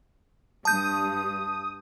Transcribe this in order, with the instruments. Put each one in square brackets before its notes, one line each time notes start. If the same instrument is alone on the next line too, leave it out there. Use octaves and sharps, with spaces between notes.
[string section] G2 [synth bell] A5 G6 [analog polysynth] D#6